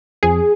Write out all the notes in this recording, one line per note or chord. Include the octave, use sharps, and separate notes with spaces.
F2 G#4